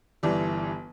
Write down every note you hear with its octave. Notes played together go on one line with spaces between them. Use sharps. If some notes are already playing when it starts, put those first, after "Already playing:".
G1 E3 G3